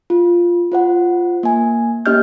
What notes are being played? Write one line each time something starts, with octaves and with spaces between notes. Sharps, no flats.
F4
F4 C5 F#5
A#3 G#5
A#3 C#4 G4 D#5 F6 G6